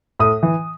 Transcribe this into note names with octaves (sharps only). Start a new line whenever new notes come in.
A2 D#6
E3